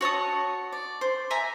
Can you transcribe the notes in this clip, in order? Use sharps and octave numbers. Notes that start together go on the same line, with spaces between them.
F#4 C#5 A5 D#6
D5
C5
E5 G#5 A#5